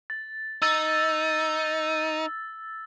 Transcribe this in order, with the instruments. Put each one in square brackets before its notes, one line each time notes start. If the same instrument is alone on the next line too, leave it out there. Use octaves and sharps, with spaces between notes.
[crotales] A6
[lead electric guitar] D#4 [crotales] E6 A6